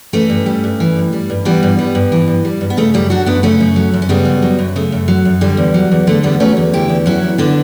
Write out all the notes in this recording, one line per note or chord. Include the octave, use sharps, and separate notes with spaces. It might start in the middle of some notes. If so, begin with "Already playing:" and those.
E3 A3 C#4
G2
G3
G2
E3
G2
G3
G2
E3 G3 B3
G2
G3
G2
E3
G2
G3
G2
B3
C#3 A3
F#2 G3
F#3 D4 F#4
F#2 B3 D4
C#3 A3 C#4
F#2
F#3
F#2
C#4
C#3 G3 B3
F#2
F#3
F#2
C#3 A3
F#2
F#3
F#2
D3 G3
E2
F#3
E2
D3 A3
E2 G3 B3
F#3 A3 C#4
E2
D3 E4 G4
E2
F#3 C#4 E4
E2
D3 B3 D4